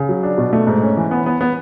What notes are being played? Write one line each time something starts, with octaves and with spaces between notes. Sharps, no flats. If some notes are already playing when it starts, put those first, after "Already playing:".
Already playing: C#3
F#3
D4
B2
A3
G#2
C#4
E3
B3
B3
B3